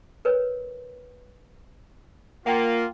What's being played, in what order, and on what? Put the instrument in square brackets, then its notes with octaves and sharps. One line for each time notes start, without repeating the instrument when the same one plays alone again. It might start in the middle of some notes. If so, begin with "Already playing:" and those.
[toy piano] A#4 B4 C#5
[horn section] A#3 F4 [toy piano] F#5 G5